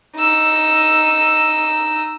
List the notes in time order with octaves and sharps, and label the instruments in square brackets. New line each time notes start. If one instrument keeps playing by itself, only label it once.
[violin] D#4 E6